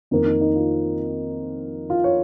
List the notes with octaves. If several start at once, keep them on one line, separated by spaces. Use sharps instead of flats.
F2 D#3 A#3 D#4
D#4
D#4
F4
F4
C#5